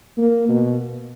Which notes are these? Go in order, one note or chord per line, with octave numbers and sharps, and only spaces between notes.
A#3
B2